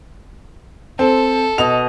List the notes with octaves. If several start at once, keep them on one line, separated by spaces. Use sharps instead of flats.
C4 A4
B2 D#5 F7